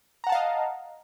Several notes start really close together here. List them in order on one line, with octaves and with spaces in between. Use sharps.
A#5 F#5 A5 F5 D#5